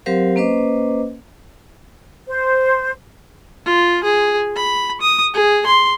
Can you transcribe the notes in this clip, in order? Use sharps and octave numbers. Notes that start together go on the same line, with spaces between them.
F#3 C4 G4 A#4 C5 F5
A#3 C#4 B4 C5 D#5 D6
C5
F4
G#4
B5
D#6
G#4
C6